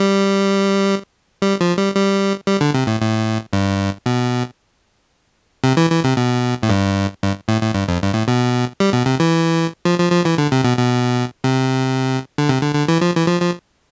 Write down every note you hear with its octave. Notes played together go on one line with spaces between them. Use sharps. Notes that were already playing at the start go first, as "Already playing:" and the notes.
Already playing: G3
G3
F3
G3
G3
G3
D3
C3
A2
A2
G2
B2
C3
E3
E3
C3
B2
A2
G2
G2
A2
A2
G2
F2
G2
A2
B2
G3
B2
C3
E3
F3
F3
F3
E3
D3
C3
B2
B2
C3
D3
C3
D3
D3
E3
F3
E3
F3
F3